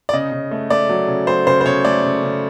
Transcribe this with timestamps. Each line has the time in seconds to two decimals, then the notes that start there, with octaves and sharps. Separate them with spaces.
0.09 D5
0.13 C#3 D#5
0.32 C#3
0.51 A3
0.70 A3 D5
0.89 F#3
1.08 C#3
1.27 F#3 C5
1.47 C#3 C5
1.61 C5
1.66 C#3 C#5
1.85 A3 D5
2.04 C#3
2.23 C#3